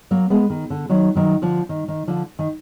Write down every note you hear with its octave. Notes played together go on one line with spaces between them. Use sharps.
F#3 A#3
G#3 B3
D#3
D3
D#3 F#3
D#3 F#3
D3 F3
D#3
D#3
D3 F3
D#3